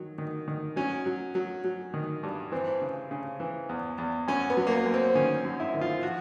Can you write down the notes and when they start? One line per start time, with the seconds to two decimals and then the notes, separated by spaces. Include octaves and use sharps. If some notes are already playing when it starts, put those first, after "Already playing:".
Already playing: D#3 F#3
0.18 D#3
0.48 D#3
0.76 F#3 C#4
1.06 F#3
1.35 F#3
1.64 F#3
1.94 D#3
2.23 G2
2.52 E3 C4
2.81 C#3
3.11 C#3
3.40 E3
3.69 E2
3.98 E2
4.28 F#2 C#4
4.50 B3
4.57 F#3
4.67 A#3
4.71 B3
4.86 F#2
4.94 C4
5.15 D#3 C#4
5.45 F#2
5.60 E4
5.74 D#3
5.81 F4
6.03 F3 F#4